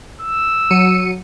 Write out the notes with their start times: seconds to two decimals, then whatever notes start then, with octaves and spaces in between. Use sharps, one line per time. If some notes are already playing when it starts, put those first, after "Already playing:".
0.21 E6
0.70 F#3 C#7 D#7